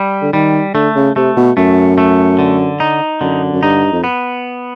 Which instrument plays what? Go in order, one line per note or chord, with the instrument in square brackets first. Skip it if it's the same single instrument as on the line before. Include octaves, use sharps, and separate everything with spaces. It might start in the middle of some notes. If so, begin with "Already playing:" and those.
Already playing: [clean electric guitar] G3
[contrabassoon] D3
[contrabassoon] D#3 [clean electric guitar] G3
[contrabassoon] D3 [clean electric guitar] A3
[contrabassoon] C#3
[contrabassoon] C3 [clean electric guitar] A3
[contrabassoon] B2
[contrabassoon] F#2 [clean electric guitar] A3
[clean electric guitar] A3
D3
D#4
[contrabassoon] F#2 [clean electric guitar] D3
[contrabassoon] F#2
[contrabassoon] G2 [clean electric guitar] D#4
[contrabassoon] F2
[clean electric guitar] B3